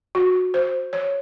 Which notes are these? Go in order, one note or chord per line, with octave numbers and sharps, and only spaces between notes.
F#4
C5
C#5